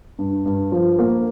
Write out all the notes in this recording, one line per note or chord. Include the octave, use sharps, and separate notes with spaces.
G2
G2
F3
A#3